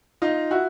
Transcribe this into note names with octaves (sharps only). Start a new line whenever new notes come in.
D#4 F4
E4 F#4